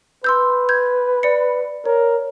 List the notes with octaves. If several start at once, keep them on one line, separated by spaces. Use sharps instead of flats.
B4 C6 E6 G6
G6 G#6
D5 C#7
A#4 C#5